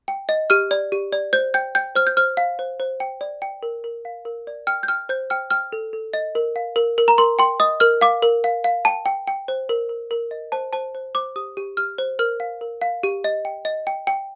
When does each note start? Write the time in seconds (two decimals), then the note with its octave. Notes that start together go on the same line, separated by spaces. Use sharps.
0.08 G5
0.29 D#5
0.50 G4 F6
0.71 D5
0.92 G4
1.12 D5
1.33 C5 G6
1.54 G5 G6
1.75 G5 G6
1.95 C5 F6
2.07 G6
2.17 C5 F6
2.37 F5
2.59 C5
2.80 C5
3.00 G5
3.21 D5
3.42 G5
3.63 A#4
3.84 A#4
4.05 F5
4.25 A#4
4.47 D5
4.67 G5 F6
4.83 G6
4.88 G5 F6
5.09 C5 G6
5.30 G5 F6
5.51 G5 F6
5.72 A4
5.93 A4
6.13 D#5
6.35 A#4
6.56 F5
6.76 A#4
6.98 A#4
7.08 A#5
7.18 A#4 C6
7.39 G5 C6
7.60 D#5 D#6
7.80 A#4 F6
8.01 F5 D6
8.22 A#4
8.44 F5
8.64 F5
8.85 G5 A5
9.06 G5
9.28 G5
9.48 C5
9.69 A#4
9.89 A#4
10.11 A#4
10.31 D#5
10.52 C5 A5
10.73 C5 A5
10.95 C5
11.15 C5 D6
11.36 G4 D#6
11.57 G4
11.77 G4 F6
11.98 C5
12.19 A#4 F6
12.40 F5
12.61 A#4
12.82 F5
13.03 G4
13.24 D#5
13.45 G5
13.65 D#5
13.87 G5
14.07 G5